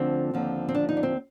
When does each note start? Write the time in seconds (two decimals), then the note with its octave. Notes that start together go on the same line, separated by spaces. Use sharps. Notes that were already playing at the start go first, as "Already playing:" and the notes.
Already playing: D2 D3 F3 C4
0.34 D#2 D3 F3
0.69 C4
0.75 D4
0.89 D#4
0.97 D4
1.03 C4